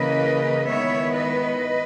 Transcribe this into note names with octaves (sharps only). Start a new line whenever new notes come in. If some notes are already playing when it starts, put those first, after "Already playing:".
Already playing: C#3 E3 A#3 B4 D#5
D#3 G#3 B3 E4 C#5 E5
B4 D#5